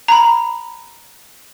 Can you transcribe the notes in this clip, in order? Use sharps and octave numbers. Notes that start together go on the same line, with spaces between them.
A#5 B5